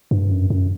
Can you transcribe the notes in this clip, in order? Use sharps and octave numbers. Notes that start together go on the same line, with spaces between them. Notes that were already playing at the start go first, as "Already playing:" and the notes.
G2
F#2
F#2